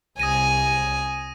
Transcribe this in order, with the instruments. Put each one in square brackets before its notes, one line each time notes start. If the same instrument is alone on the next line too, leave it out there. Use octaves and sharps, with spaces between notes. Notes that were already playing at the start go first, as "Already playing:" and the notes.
[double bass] C2 [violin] G#5 [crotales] D#6 A#6 D#7